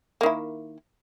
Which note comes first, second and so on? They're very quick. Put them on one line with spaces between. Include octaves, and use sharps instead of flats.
A#3 D#3 E4